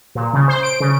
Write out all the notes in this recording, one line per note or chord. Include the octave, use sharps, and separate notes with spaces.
A#2
C#3
C5
D7
C#3